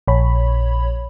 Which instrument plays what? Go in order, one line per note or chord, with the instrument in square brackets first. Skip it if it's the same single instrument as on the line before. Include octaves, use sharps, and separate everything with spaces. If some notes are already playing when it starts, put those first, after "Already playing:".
[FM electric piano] A#1 C#5 B5